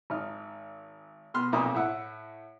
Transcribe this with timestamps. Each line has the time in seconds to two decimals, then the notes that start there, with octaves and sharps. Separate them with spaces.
0.10 G#1 D#4 F6
1.34 B2 C6 F6
1.52 B1 F2 A#2 D#5 A#5 D6
1.74 A2 E5 F#5